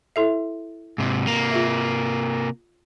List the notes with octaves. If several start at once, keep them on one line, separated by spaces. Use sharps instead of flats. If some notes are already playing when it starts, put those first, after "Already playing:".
E4 A4 E5
G#2 C3
C3 A#3
F4 G#4 E5